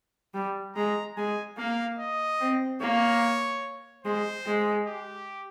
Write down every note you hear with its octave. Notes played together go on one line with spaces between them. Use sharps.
G3
G#3 A#5
G#3 G#5
A#3 F5
D#5
C4
A#3 C#5
G#3 C5
G#3
G4